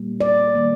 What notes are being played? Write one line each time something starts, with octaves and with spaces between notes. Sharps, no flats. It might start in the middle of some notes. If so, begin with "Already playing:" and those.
Already playing: A#2 G3 A#3
D5
D#3 G3 A#3